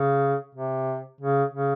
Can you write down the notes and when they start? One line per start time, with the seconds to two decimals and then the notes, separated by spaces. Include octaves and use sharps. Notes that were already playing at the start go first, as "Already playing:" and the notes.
Already playing: C#3
0.55 C3
1.21 C#3
1.54 C#3